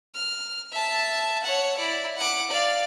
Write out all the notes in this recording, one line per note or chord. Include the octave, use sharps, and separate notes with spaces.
F6
E5 A5
C#5 F#5
E4 D5
F#5 D6
D5 F5